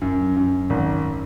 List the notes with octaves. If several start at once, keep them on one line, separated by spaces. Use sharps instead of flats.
F#2
F#2
G#1